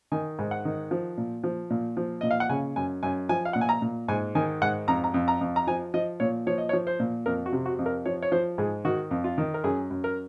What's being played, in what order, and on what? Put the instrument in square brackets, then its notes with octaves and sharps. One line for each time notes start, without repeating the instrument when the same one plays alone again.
[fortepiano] D#3 G#5
G#2
F#5
D#3
F3
A#2
F3
A#2
F3
A#2 D#5
F5
F#5
C#3 G#5
F#2 G#5
F#2 G#5
F3 G#5
F5
A#2 F#5
G#5
A#5
A#2
G#2 G#5
D#3 G#5
G#2 F#5
F2 A#5
A#5
F2
A#5
F2
A#5
F3 G#5
F3 D#5
A#2 C#5
F3 C#5
D#5
C#5
F3
C5
A#2
F2 A#4
F#4
C3
F#4
F2
A#4
F3 C#5
C#5
F3 C5
G#2 G#4
D#3 F#4
F2
F4
D#3
A#4
F#2 G#4
F#2
A#4